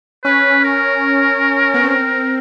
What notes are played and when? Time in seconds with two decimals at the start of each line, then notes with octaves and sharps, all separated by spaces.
0.24 C#4 B4
0.64 A#4
1.74 B3
1.84 C4